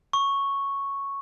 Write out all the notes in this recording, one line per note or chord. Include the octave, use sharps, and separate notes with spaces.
C#6